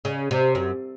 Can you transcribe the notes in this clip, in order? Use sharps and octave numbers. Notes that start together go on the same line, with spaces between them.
C#3
C3
F#2